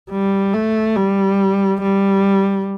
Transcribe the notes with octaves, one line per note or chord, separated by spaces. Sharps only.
G3
A3
G3
G3